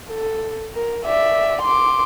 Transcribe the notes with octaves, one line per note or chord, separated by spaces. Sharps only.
A4
A#4
D5 E5
C6 D6